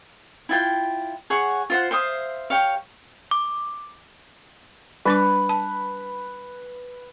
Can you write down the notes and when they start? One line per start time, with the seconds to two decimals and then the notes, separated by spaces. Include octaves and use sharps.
0.49 E4 F4 G5
1.30 G#4 C#5 F#5 C#6
1.70 F4 C5 F#5
1.91 C5 E5 F5 D#6
2.50 G4 C#5 F5
3.31 D6
5.05 G3 D4 B4 D6
5.49 A5